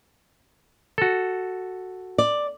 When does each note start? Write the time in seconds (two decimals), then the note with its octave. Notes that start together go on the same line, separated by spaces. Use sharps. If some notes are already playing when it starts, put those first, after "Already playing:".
0.98 F#4 A4
2.18 D5